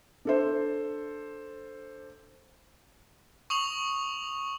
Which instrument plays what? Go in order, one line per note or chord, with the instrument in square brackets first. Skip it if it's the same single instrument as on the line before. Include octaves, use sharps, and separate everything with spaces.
[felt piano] D4 A4 C5
[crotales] C#6 D#6 F7 F#7